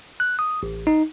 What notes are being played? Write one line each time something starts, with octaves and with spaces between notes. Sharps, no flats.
F#6
D#6
A1
D#4